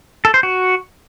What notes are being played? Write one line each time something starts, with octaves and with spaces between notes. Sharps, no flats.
A4
C5
F#4